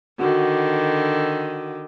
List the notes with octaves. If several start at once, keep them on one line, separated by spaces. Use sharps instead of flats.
D3 D#3 F#4